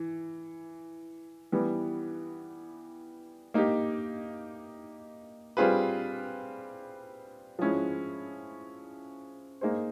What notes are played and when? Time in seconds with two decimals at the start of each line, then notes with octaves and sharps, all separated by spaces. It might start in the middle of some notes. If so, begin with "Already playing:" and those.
Already playing: E3
1.52 E3 G3 B3
3.54 A#3 D#4 G4
5.57 G3 C4 F4 G#4 B4
7.59 F3 G#3 C#4 E4
9.61 A#3 D#4 G#4 C5